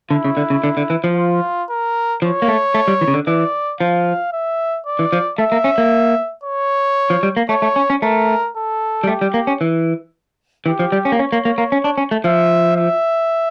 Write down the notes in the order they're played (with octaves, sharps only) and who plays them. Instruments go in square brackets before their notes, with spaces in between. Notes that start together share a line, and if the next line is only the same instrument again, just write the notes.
[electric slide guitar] D3 [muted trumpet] E4
[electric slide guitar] C#3
D3
C#3
D3
D3
E3
F3
[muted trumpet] F4
A#4
[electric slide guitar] F3 [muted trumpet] C#5
[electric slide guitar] A#3
A3
A3
G3
E3
C#3
D3
[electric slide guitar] E3 [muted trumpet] D5
[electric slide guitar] F3 [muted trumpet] F5
[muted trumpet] E5
D5
[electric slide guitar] E3
F3
[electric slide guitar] A3 [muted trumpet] E5
[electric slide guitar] A#3
C#4
A#3
[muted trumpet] C#5
[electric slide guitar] F3
G3
A#3
[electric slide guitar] A3 [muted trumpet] C#5
[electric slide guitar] A3
C#4
C#4
[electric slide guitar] A3 [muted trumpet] A#4
[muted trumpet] A4
[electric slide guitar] G3
[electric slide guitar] A3 [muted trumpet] G4
[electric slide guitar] G3
A#3
C#4
E3
[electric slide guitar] E3 [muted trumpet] G4
[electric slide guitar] F3
G3
C#4
A#3
[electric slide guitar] C#4 [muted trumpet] C#5
[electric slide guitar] A#3
A#3
A#3
C#4
D4
C#4
A3
[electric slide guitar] F3 [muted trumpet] E5
[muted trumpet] E5